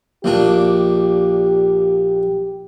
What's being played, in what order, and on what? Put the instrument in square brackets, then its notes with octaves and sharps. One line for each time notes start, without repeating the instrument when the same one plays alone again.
[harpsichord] A#1 A#2 D4 [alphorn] G4